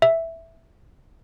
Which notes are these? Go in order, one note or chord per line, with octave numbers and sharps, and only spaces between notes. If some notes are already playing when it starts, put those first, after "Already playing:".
E5